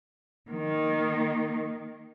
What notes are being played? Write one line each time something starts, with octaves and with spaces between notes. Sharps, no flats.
D#3 A#3